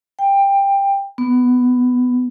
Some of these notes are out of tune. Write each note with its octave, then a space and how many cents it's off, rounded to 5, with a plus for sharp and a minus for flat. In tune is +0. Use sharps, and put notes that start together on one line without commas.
G5 +15
B3 +10